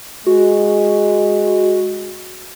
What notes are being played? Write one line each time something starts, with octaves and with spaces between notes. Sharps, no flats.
G#3 F#4